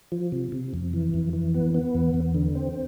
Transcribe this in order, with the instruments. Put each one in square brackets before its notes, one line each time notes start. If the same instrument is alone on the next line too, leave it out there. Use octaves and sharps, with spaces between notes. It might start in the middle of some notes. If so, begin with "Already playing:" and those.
[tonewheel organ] F3
C3
C3
F2
E3
F2
E3
B3
B3
E2
E2
D3
C4